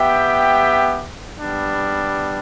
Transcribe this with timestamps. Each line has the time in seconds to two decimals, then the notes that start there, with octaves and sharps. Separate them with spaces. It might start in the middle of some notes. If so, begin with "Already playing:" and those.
Already playing: B3 G4 E5 G5
1.37 G3 B3 D4